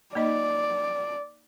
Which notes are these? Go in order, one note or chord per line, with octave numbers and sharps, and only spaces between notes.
A#3 D#4 D5 D#5